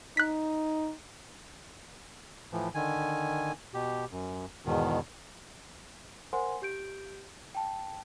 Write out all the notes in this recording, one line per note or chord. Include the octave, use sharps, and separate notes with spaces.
D#4 F#6 B6
A2 E3 F3
D3 D#3 G#5
B2 G4
F#2
E2 G#2 B2 D#3
A#4 C5 F#5 G#5 C6
G4 G6 D7
G5 A5